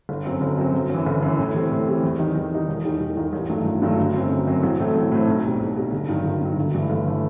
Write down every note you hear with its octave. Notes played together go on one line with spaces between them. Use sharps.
G1
F#2 F#3 C4
G1
F#2 F#3 C4
G1
F#2 E3
G1
F#2 E3
A2
E3 G3 C4
A2
E3 G3 C4
E2
D#3 G3 D#4
E2
D#3 G3 D#4
E1
D#2 D#3 G3 D#4
E1
D#2 D#3 G3 D#4
A1
G2 D#3 F#3 A3
A1
G2 D#3 F#3 A3
G1
F#2 F#3 C4
G1
F#2 F#3 C4
A1
A2 F#3 A3 C4
A1
A2 F#3 A3 C4
B1
B2 G3
B1
B2 G3
G1
G2 D#3 F#3
G1
G2 D#3 F#3
G1
G2 E3 A3
G1
E3 A3